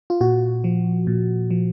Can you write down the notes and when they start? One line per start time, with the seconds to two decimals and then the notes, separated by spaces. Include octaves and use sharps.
0.10 F4
0.21 A#2 F#4
0.64 F3
1.07 A#2
1.50 F3